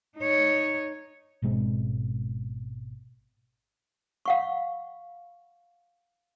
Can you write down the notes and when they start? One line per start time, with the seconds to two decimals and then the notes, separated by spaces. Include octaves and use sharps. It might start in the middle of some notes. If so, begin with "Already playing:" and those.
0.18 D#4 C#5
1.42 G#1 B2 G#3 C4
4.26 F5 F#5 C#6